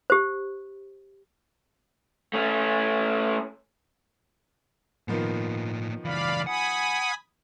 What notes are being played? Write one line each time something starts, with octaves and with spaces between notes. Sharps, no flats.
G4 C5
A3 C#4
A2 D#3 F3 A#3 B3
C#2 E3 D5 F5 B5
F#5 G#5 B5 D#6